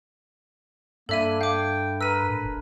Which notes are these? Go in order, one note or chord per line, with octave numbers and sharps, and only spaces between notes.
G2 D3 A#3 E4 A4 E5 D#7
F5 G5 D6
A#4 B4 E6 D#7
A2
G1